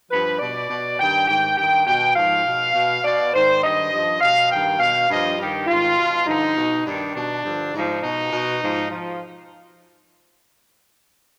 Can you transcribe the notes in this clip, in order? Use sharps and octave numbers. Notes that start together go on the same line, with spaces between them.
G2 F3 B4
B2 D5
B2
G2 D#3 G5
G#2 D#3 G5
G2 D#3 G5
B2 G5
G#2 F3 F5
B2
B2
B2 D5
G#2 D#3 C5
G2 D#3 D#5
G2 F3
B2 F5
G2 D#3 G5
B2 F5
G2 F3 D#5
G2 D#3 G4
G#2 D#3 F4
B2
G2 D3 F3 D#4
B2
G2 D#3 D4
B2 D4
G2 D3 F3
G#2 F3 D#4
B2 D#4
B2
G#2 F3
F3